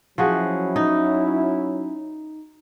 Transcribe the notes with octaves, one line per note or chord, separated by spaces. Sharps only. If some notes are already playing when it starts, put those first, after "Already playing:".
F3 F#3 C#4 E4 F#4 G#4
D#4